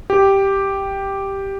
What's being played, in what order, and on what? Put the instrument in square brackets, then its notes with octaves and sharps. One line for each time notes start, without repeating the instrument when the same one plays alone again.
[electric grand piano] G4